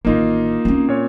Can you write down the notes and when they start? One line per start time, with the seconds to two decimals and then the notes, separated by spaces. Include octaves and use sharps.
0.05 A1 D#3 A#3 D#4 F4
0.65 C4 C#4
0.88 A#2 C#5